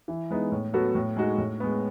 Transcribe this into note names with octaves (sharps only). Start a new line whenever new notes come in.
E3
G#3 B3 D#4
A2
F#3 B3 F#4 A4
A2
G#3 D#4 F#4
A2
G#3 B3